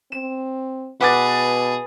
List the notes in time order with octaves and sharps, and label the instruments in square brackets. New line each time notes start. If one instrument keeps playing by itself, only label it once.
[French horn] C4 [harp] E7
[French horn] B2 [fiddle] G#4 [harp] B4 [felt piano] F#5 D6 A6